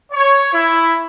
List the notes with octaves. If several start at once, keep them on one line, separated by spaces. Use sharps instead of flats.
C#5
E4